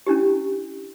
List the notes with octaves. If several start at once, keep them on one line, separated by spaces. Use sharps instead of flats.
C#4 D4 E4 G4